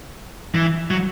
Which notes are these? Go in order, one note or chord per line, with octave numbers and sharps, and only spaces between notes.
E3
F#3